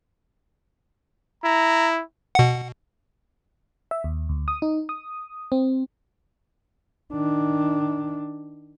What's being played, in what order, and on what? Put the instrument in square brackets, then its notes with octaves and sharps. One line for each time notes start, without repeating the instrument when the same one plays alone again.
[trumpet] E4 [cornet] A#5
[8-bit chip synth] B2 F#5
[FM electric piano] E5
D#2
D2
D#6
D#4
D#6
C4
[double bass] D#3 D4